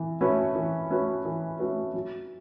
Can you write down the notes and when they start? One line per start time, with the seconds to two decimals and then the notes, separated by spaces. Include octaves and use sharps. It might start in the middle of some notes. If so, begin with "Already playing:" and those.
Already playing: E3
0.21 A3 C#4 F#4 B4
0.55 E3
0.90 A3 C#4 F#4 B4
1.25 E3
1.59 A3 C#4 F#4 B4
1.94 F#3